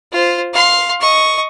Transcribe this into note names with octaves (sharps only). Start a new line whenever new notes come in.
F4 C5
F5 C6
D#5 C#6